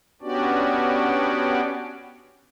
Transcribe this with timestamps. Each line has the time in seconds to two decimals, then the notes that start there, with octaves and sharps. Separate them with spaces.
0.22 B3 C#4 D4 F#4 G4 D5